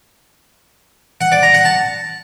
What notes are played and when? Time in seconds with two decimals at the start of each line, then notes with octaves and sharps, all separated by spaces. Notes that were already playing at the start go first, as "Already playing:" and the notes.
1.21 F#5
1.32 D5
1.43 A#5
1.54 F#5
1.65 A5